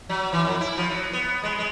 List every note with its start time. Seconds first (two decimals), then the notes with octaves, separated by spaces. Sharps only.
0.09 F#3
0.33 E3
0.45 F2
0.61 E4
0.77 F3
0.90 F#3
1.13 B3
1.43 G#3
1.58 G#3